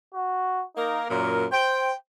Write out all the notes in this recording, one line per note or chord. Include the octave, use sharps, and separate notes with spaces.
F#4
A#3 D#4 A#4
F#2 A#2 A#4
C5 G5